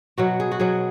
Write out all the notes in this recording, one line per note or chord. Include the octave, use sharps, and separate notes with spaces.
B2 F#3 F#4
G#4
F#4
B2 F#3 G#4